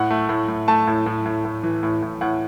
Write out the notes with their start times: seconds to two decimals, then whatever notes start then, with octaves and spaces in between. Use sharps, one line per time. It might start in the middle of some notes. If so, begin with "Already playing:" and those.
Already playing: A2 F#5
0.11 A3
0.29 A2
0.48 A2
0.68 A3 A5
0.87 A2
1.06 A2
1.25 A2
1.45 A2
1.63 E3
1.83 A2
2.02 A2
2.21 A2 F#5